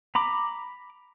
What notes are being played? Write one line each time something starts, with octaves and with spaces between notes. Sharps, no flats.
A#5 B5 D6